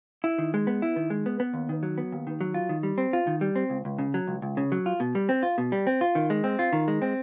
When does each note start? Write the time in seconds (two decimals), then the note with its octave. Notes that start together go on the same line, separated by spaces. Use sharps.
0.24 E4
0.38 D#3
0.54 G#3
0.67 B3
0.82 E4
0.96 D#3
1.10 G#3
1.26 B3
1.40 B3
1.54 D#2
1.69 D#3
1.83 F#3
1.98 B3
2.12 D#2
2.27 D#3
2.41 F#3
2.54 F4
2.69 D#3
2.83 G3
2.98 C4
3.13 F4
3.27 D#3
3.41 G3
3.56 C4
3.70 C#2
3.85 C#2
3.99 C#3
4.14 F#3
4.27 C#2
4.42 C#2
4.57 C#3
4.72 F#3
4.86 F4
5.00 B2
5.15 G3
5.29 C4
5.43 F4
5.58 B2
5.72 G3
5.87 C4
6.01 F4
6.15 D#3
6.30 G#3
6.44 C4
6.59 F4
6.73 D#3
6.88 G#3
7.02 C4